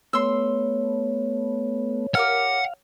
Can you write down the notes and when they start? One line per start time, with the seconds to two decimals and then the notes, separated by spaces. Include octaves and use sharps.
0.13 A3 B3 C#5 C6 E6
2.15 G4 A#4 F5 F#5 F6